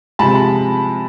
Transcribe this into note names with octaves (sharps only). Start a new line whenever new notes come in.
C3 F3 G#3 A5 B5